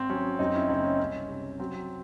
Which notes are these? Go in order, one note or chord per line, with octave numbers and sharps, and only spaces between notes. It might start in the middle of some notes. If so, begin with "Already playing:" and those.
Already playing: G#1 C4
F#3 C#4
F#2 C4 D#4
C#4 E4
F#1 C4 D#4
C#4
C2 C#4
C3
F#3 C4